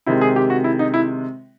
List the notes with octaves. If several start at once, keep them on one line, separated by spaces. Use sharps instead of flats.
C3 D#3 G#3 E4
G#4
G4
F#4
E4
D#4
E4